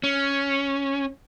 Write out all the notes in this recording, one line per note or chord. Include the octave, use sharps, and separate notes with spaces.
C#4